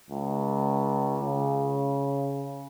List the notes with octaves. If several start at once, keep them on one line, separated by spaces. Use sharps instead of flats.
C#2
C#3